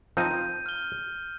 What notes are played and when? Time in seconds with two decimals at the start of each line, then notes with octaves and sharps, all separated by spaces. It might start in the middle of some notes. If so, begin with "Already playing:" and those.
0.17 F3 C4 D#4 G6 D#7
0.66 F6 G7